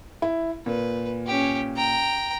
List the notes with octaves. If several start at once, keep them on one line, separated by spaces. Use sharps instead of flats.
E4
A#2 B4
C#4 G4
G5 A#5